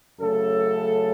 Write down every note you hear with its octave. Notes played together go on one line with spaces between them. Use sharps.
F#2 C#3 A3 A4